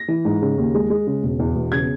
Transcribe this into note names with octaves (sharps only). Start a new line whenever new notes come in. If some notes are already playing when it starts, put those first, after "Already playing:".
Already playing: A#6
E3
G#2
C#3
D#2
G#3
G#3
C#3
E1
E2
E1
C#3 G#6